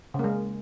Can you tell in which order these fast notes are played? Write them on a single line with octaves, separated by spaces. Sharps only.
C#3 A#3 G#3